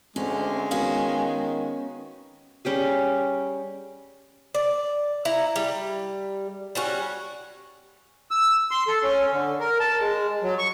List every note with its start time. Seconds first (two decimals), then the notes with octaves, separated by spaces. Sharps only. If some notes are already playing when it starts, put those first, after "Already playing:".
0.16 D2 G#3 C4 C#4
0.71 D#3 B3 C#4 F#4 F5
2.65 G3 C#4 G4 G#4
4.55 D5
5.25 E4 A#5
5.56 G3
6.75 G3 C#4 F#4
8.31 E6
8.71 C6
8.88 A4
9.03 C#4
9.32 D3
9.60 A#4
9.80 A5
9.99 G#3
10.43 F#3
10.59 C#6